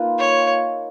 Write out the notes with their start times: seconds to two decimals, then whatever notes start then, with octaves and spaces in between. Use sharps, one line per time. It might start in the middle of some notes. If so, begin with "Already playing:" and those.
Already playing: A#3 D#4 F4 B4
0.18 C#5